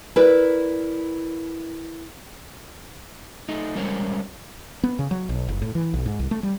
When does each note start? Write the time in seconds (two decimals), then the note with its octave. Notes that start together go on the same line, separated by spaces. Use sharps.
0.16 E4 A#4 B4 D5
3.49 A3 D#4
3.75 G3 G#3 C#4 A#4 C5 C#5
4.83 B3
4.99 C#3
5.11 F#3
5.29 B1
5.49 F#1
5.62 A2
5.75 E3
5.94 B1
6.06 G#2
6.19 C2
6.31 A3
6.43 G3